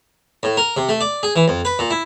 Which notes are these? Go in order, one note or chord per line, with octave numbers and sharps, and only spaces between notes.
A2
A#4
C3
A3
D5
G#4
E3
F2
B4
A#2
E4